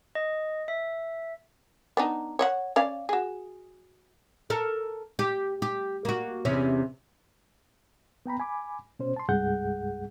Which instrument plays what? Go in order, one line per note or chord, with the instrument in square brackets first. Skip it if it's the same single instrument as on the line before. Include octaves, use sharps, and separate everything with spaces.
[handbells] D#5
E5
[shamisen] B3 D4 D#4
C#5 D#5 F#5
C#4 D5 F5
F#4 G#4
[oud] A4 A#4
G4
G4
A#3 F#4
E2 C3 C#4
[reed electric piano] B3 G5 A#5 B5
G#5 B5 D6
B2 C#4 C5
A5 C6
C2 G2 G#3 G#4 F#5 G6